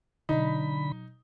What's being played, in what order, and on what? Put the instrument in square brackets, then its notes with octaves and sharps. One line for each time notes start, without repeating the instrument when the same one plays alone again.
[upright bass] B2 F#3 [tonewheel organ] D3 B5 [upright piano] D#4